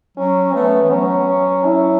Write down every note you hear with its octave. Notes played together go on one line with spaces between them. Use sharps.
F#3 C#4
A3 B3
E3
F#3 C#4
E4